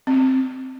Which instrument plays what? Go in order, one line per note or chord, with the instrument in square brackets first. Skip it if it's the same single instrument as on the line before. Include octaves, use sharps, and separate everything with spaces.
[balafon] C4